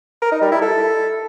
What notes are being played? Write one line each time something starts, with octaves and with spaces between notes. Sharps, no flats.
A#4
D#4
G3
E4
A4